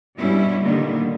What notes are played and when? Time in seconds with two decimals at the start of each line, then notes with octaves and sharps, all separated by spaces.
0.16 G2 B2 G3 C#4 E4
0.62 A#2 D3 D#3 G3 A#3 B3